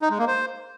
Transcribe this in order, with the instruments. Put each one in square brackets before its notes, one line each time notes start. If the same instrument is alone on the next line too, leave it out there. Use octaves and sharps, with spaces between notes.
[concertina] D#4
G#3
A#3
C5